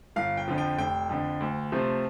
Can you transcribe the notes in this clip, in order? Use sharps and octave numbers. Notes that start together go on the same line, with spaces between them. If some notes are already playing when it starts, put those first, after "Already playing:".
G1 F5
G5
F2 D3 F3
G5
F1 G5
F2 D3
D2
C3 F3 A3 C4